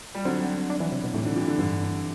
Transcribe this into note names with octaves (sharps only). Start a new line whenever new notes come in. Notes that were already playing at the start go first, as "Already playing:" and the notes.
G3
D3 F#3 C4
D4
E3
C3
B2
A2 C3 E3
D3
C3 E3
D3
G2 D3